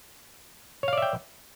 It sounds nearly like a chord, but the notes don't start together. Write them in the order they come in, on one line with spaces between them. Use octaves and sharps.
C#5 F5 D5 E5 G5